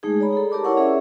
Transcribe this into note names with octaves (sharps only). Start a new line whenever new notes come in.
G#3 A3 D#4 G#4
C#5 D5 A#5 B5
G#4 A4
G4 A#4 D5 A5 D6
E4 A#4 C#5 F#5 C#6
C#4 G#4 C#5 E5